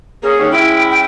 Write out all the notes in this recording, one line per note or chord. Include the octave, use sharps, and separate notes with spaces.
A#3 C#4 G#4
D#2 C#4
G#3 C#4 E4 G5
G5